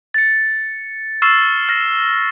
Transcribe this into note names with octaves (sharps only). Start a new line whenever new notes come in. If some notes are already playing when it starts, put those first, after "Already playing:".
A6 C#7
C#6 E6 F6 A6 C7 E7
F6 A#6